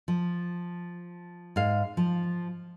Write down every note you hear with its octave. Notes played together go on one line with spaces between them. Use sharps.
F3
G#2 F5
F3